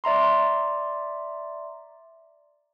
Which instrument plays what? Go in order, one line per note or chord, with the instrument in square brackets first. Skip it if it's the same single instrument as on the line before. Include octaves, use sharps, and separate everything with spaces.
[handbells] D5 E5 A#5 C6